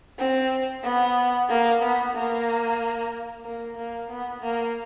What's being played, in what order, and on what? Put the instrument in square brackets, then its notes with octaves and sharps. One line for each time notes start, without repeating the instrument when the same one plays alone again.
[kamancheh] C4
B3
A#3
B3
A#3
A#3
A#3
B3
A#3